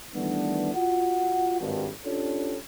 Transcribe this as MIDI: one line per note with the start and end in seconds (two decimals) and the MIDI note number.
0.15 0.72 51
0.15 0.72 52
0.15 0.72 55
0.15 0.72 57
0.15 0.72 59
0.15 0.72 62
0.74 1.60 65
0.74 1.60 66
0.74 1.60 78
1.61 1.88 32
1.61 1.88 43
2.05 2.57 61
2.05 2.57 62
2.05 2.57 65
2.05 2.57 67
2.05 2.57 69
2.05 2.57 73